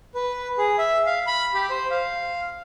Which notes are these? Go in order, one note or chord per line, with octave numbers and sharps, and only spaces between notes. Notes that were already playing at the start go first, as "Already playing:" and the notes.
B4
G#4
E5
F5
B5
G4
C5
F5